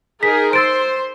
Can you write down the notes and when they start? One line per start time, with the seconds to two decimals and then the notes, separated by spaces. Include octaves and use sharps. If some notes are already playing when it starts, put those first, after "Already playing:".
0.23 D#4 G#4 A#4 B6
0.53 C5 C6 E6 A6 D7